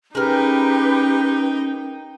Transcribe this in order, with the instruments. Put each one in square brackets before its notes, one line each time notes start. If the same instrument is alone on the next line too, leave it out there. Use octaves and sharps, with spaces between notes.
[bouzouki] G#3 A#4 [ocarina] C#4 [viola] D#4 G5 [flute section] G4 B4